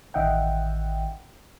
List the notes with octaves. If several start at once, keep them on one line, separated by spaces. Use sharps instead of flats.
A1 D#3 D#5 E5 F#5 G5